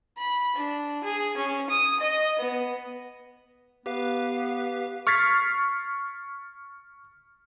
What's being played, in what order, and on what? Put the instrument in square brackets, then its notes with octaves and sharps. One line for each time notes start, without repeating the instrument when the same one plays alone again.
[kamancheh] B5
D4
G#4
C#4
D#6
D#5
B3
[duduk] B3 [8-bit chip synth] G4 B4 F5
[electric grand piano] C#6 F6 G#6 A6 B6 C7